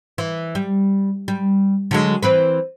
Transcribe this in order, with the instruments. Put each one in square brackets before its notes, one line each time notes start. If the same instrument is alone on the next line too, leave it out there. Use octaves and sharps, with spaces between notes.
[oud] E3
G3
G3
D3 F#3 G#3
E3 C4 B4